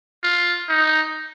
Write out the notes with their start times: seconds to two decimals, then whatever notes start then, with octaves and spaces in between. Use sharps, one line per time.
0.23 F4
0.69 D#4